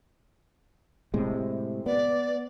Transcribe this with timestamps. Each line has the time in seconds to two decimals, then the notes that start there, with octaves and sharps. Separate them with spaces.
1.14 A2 C3 G#3
1.86 B3 D5